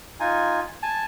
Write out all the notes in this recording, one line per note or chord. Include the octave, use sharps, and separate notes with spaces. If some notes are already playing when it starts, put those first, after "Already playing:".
D#4 F4 G#5
G#5 A5